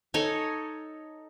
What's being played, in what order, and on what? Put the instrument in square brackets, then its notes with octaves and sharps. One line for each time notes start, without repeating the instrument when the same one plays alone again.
[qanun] D#4 A4 C#5 G#5